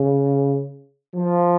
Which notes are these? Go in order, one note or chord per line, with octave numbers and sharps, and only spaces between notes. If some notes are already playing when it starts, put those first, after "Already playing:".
Already playing: C#3
F3